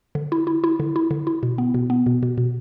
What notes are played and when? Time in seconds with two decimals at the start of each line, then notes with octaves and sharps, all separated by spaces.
0.15 D3
0.32 E4
0.47 E4
0.64 E4
0.80 D3
0.96 E4
1.11 D3
1.27 E4
1.43 B2
1.58 B3
1.74 B2
1.90 B3
2.06 B2
2.23 B2
2.38 B2